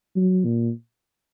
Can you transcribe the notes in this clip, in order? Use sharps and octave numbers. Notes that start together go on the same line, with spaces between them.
F#3
A#2